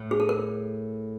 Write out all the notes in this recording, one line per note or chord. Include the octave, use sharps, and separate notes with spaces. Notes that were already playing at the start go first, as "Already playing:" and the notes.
Already playing: A2
G#4
A4
A#4